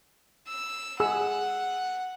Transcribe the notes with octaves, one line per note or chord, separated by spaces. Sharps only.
E6
G#4 F#5 E6